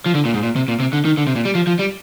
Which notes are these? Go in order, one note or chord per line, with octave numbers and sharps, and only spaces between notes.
F3
D3
A#2
G#2
A#2
C3
A#2
C3
D3
D#3
D3
C3
A#2
G3
F3
F3
G3